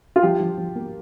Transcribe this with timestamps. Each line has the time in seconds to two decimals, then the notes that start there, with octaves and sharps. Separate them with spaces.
0.16 F4
0.23 F3 G4
0.40 F3
0.58 F3
0.75 A#3